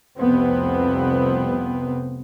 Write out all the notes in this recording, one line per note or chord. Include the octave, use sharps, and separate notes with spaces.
F1 C2 F2 C3 B3 C4